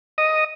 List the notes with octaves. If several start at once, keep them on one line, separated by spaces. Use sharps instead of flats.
D#5